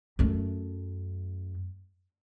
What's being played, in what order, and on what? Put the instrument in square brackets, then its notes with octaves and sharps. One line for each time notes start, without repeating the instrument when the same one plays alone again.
[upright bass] F#2 A3